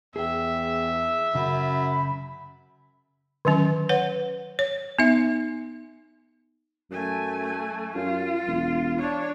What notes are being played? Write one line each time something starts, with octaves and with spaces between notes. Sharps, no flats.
E2 G#4 E5 G5
F#2 C#3 B5
D3 D#3 F#3 C#4
B4 C#5 F#5
C#5
B3 D#4 E5
F#2 A3 G#5
F#2 F4
E1
D4 C#5